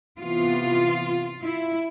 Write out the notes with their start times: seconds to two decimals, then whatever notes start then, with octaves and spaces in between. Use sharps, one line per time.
0.20 C3 E3 B3 F4
1.43 E4